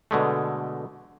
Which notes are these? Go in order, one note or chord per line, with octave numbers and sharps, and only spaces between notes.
B2 D3 G#3 A3